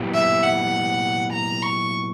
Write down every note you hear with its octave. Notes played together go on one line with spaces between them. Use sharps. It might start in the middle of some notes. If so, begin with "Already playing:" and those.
Already playing: A#2 F#3 B3 E4 G4
E5
F#5
A#5
C#6